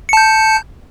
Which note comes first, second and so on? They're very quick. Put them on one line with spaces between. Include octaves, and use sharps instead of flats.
C#7 A5 G6